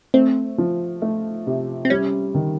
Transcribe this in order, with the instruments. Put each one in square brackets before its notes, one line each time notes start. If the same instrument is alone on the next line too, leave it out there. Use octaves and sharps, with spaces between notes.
[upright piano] A3 [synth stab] C4
[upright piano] F3
A3
C3
[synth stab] C4
[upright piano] G3 [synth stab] C#4
[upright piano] D#3